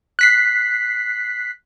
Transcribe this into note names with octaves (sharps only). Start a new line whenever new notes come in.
F#6 B6 C7